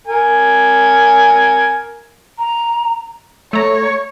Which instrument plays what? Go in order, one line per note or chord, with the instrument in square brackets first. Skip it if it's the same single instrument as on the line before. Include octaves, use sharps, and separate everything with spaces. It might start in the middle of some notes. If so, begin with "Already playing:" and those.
[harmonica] A#4 G#5
[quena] A#5
[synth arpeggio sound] A3 A#5 [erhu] C#5